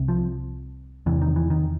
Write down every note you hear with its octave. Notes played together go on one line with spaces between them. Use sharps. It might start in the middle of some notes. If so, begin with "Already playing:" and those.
Already playing: C2 C3
F3
E2 C3 E3
D#3
E3
D#3